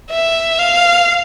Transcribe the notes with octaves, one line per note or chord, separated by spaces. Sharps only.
E5
F5